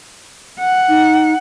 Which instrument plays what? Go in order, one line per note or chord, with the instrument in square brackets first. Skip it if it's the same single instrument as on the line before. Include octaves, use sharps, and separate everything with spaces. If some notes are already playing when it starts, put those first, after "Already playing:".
[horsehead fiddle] F#5
[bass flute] D#4